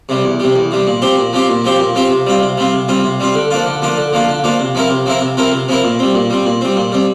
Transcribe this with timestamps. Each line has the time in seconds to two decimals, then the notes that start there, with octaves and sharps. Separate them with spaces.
0.09 C3 G3
0.24 E2
0.40 C3 G3
0.56 E2
0.71 C3 G3
0.87 A#2
1.02 F3 C4 G4 C5
1.17 A#2
1.33 F3 C4 G4 C5
1.49 A#2
1.64 F3 C4 G4 C5
1.79 A#2
1.95 F3 C4 G4 C5
2.11 C3
2.26 G3 C4 F4
2.42 C3
2.58 G3 C4 F4
2.73 C3
2.88 G3 C4 F4
3.04 C3
3.20 G3 C4 F4
3.34 D3
3.50 F3 A#3 D4 F4
3.66 D3
3.82 F3 A#3 D4 F4
3.97 D3
4.12 F3 A#3 D4 F4
4.28 D3
4.44 F3 A#3 D4 F4
4.59 C3
4.75 F3 C4 E4 A#4
4.90 C3
5.06 F3 C4 E4 A#4
5.21 C3
5.37 F3 C4 E4 A#4
5.52 C3
5.68 F3 C4 E4 A#4
5.84 A#2
5.99 G3 C4
6.15 A#2
6.30 G3 C4
6.46 A#2
6.61 G3 C4
6.76 A#2
6.92 G3 C4